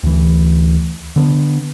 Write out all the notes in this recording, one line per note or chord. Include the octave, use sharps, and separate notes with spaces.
D2 E3
D3 B3